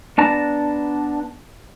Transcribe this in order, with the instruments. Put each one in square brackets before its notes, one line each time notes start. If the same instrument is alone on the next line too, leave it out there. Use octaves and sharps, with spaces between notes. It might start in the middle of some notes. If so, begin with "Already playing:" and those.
[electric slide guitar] B3 D4 A5 A#5